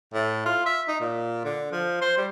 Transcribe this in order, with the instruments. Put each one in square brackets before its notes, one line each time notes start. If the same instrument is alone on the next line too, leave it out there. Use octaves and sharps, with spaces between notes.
[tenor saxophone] A2
F4
E5
D#4
A#2
D3
F3
C5
G3